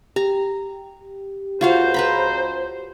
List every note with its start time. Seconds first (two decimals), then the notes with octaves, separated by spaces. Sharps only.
0.16 G4 A#5
1.61 C#2 F4 F#4 C5 F5
1.94 B4 A#5 B5